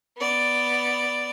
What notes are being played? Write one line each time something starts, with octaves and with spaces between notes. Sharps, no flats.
B3 D5